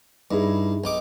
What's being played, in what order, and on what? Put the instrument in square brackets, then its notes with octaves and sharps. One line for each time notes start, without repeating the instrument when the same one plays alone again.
[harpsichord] G2 [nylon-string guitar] D#4 E4 G#4
[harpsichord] B1 D#4 D6